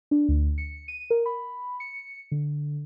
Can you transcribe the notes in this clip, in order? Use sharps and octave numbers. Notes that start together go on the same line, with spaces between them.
D4
D2
C#7
D#7
A#4
B5
C#7
D3